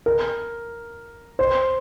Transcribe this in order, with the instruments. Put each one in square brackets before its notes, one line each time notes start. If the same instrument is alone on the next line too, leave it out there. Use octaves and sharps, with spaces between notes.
[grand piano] A#4
C5